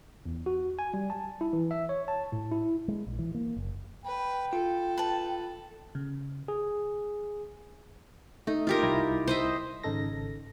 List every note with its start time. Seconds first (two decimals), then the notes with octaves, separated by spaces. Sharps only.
0.25 E2
0.46 F#4
0.79 G#5
0.94 G3
1.10 A5
1.41 E4
1.53 E3
1.71 E5
1.89 C#5
2.08 A5
2.32 A2
2.51 E4
2.88 G#3
3.07 A#1
3.19 E3
3.35 A#3
3.56 F#1
4.05 B4 G5
4.53 F4 A4
4.98 B4 A5
5.95 C#3
6.48 G#4
8.47 A3 D#4
8.67 F4 G4 A#4
8.83 C2 E4 A#6
9.27 C5 D#5 E5
9.84 G#1 C#3 D#4 A4 A#6